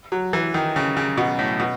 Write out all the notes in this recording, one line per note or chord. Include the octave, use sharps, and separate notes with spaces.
F#3
E3
D#3
C#3
C#3
B2
A2
B2